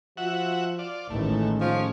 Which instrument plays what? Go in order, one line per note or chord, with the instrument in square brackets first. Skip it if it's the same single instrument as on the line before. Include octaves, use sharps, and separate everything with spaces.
[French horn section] F3 F4 [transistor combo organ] F#4 E5 F#5
[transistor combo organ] F4 D5
[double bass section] A1 [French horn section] D#3 G#3 [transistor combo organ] A3
[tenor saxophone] F3 [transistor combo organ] C#4